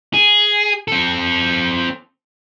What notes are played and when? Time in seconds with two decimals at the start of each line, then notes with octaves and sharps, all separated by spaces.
0.14 G#4
0.88 C4 A4